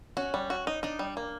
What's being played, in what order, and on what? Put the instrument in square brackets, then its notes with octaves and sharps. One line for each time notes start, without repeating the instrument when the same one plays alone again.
[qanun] C#4 [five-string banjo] F#4
[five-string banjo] G3
F#4
D#4
[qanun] D4 [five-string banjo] D#4
[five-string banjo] G3
A#3